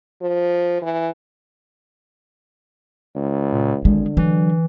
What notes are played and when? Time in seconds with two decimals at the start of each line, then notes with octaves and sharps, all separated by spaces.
0.21 F3
0.82 E3
3.15 C#2
3.53 A#2
3.85 G#1 D3 G#3
4.17 E3 F#3